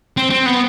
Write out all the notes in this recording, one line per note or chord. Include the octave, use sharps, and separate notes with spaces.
C4
C4
B3